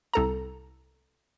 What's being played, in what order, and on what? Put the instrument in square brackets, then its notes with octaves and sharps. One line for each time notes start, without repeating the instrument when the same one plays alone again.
[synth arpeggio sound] C2 A4 A#5